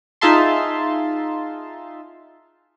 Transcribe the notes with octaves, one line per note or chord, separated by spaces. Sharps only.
D#4 F4 G#4 E5 A5 C6